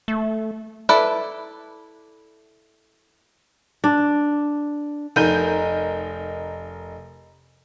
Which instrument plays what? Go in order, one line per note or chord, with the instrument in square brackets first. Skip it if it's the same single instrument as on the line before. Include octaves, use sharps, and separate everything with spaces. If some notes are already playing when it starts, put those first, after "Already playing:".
[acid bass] A3
[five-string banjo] E4 A4 B4 D5
[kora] D4
[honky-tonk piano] F1 D#4 A#4 G6 D#7